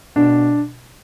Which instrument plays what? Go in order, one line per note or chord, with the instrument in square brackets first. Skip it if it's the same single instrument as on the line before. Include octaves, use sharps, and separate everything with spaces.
[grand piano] B2 D4